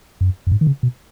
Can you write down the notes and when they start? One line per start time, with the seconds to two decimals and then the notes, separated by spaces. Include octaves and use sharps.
0.21 F#2
0.47 F#2
0.51 G#2
0.61 D#3
0.67 C#3
0.83 B2